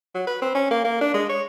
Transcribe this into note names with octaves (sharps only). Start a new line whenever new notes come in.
F#3
B4
C4
C#4
A#3
A#3
D4
G#3
C#5